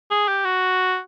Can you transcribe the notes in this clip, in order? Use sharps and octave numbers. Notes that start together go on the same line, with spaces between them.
G#4
G4
F#4